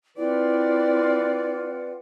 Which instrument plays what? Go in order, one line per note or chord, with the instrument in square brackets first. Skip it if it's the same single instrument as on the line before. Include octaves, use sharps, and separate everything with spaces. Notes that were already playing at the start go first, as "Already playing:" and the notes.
[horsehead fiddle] C4 D5 [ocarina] E4 [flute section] F4 B4 F#5